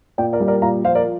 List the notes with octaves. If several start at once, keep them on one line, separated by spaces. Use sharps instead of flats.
A#2 D5 G5
A#4 D5
G3
A#4 D5
A#2 F5 A#5
F3 C5 F5
A#4 D5